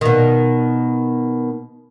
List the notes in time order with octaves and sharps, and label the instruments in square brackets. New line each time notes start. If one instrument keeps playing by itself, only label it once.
[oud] B2 D#3